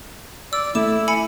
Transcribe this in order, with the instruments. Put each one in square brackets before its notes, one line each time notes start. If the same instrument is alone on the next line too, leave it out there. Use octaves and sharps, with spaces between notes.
[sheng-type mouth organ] D5 [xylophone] E6
[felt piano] A3 [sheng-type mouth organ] E4 [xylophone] D6 E7
[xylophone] G#5 B5 C#7